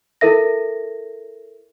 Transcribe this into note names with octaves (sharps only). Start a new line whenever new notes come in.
E4 A4 A#4 E5 A#6